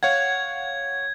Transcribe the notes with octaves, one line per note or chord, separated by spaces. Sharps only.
C#5 F5 F#5 G#6